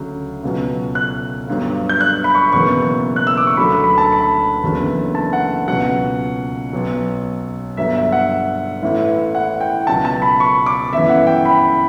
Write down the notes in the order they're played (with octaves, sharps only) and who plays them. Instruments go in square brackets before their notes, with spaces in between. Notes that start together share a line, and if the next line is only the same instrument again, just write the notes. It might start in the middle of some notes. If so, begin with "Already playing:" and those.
Already playing: [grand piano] D2 C#3 F#3
C#2 B2 F#3
F#6
G1 G2 F#3
G6
F#6
B5
C#6
F#1 E2 B2 F#3 C#6
F#6
E6
D6
C#6
D2 D3 F#3 B5
B5
A5
B5
F#1 E2 D3 F#3
A5
F#5
C#2 B2 F#3 F#5
B1 B2 F#3
G1 G2 F#3 E5
E5
F#5
A1 A2 E3
F#5
G5
C#2 B2 F#3 A5
A5
B5
C#6
D6
G1 F#2 E3 E5
F#5
G5
B5